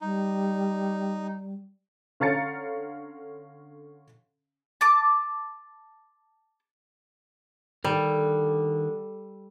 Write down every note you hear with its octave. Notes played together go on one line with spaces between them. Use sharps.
G3 D#4
D3 C#4 F5 A#5 A6 C#7
A5 D6
D3 D#3 G3 A4 A#4